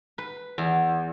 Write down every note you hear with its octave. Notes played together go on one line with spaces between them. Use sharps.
B4
E2